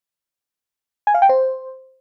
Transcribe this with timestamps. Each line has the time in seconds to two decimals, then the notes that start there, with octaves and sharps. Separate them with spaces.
1.07 G#5
1.14 F5
1.22 G5
1.29 C5